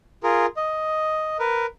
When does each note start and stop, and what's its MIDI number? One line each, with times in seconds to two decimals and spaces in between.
0.23 0.46 65
0.23 0.46 68
0.23 0.46 70
0.57 1.37 75
1.39 1.66 70
1.39 1.66 71